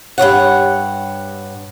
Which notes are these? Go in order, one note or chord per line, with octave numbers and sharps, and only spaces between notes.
G2 D#3 C#5 F#5